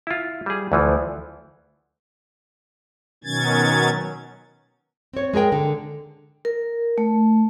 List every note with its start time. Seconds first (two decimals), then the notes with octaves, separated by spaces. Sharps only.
0.07 E4 F4
0.46 G3 G#4
0.72 D2 E3 F3
3.24 B2 D#3 F#3 C#4 G#6 A6
5.13 C4 C#5
5.33 G#3 G#4 A#4 G5
5.52 D3
6.45 A#4
6.98 A3